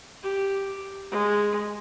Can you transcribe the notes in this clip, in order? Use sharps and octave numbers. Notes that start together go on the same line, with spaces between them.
G4
G#3